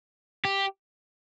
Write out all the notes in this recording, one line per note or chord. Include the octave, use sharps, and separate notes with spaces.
G4